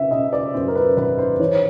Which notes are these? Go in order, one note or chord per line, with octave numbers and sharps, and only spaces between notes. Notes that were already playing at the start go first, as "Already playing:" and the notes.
Already playing: C#3 E5
C#3 D#5
D5
F#2 C5
A#4
B4
G#1 B4
C5
E3 C#5